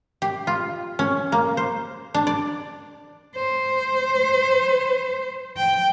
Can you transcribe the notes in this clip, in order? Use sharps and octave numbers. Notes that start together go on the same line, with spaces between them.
G4
F4
C#4
A#3
C5
D4
D5
C5
G5